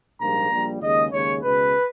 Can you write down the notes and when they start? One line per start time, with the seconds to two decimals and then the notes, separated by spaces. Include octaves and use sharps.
0.21 A#1 G#2 G3 A#3 A#5
0.51 A#1 A#2 G3
0.81 D#2 C#3 G#3 D#5
1.12 D#2 C#3 G#3 C#5
1.43 C#2 B2 G#3 B4